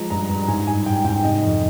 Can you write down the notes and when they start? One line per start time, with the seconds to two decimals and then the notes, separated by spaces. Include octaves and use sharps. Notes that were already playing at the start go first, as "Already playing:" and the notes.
Already playing: F3 G#3 A#5
0.10 G2 A#5
0.29 G2
0.48 G#2 G#5
0.67 G3 G#5
0.86 G#2 G5
1.05 G#2 G5
1.23 C3 D#5
1.42 F2